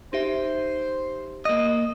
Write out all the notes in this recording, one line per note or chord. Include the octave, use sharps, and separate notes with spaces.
D#4 G4 C5 E5
A#3 D#5